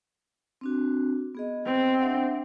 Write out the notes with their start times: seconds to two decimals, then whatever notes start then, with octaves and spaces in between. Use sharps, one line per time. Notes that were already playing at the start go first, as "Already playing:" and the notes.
0.61 C4 D4 F#4
1.35 B3 G#4 D#5
1.65 C4
1.99 D4 E5 F#5